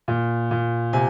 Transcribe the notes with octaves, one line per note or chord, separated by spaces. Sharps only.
A#2
A#2
C3 G#5